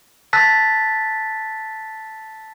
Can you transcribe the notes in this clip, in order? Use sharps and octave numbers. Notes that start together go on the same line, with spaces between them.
A5 E6 F#6 A6 B6